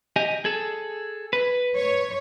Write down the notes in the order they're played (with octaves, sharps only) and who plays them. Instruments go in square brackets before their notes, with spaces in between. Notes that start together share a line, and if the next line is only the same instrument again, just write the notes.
[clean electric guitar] G4 D#5 G#5
G#4 A4
B4
[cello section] C#5